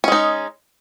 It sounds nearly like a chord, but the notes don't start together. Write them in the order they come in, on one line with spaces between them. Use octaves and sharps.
C#4 G#3 D#4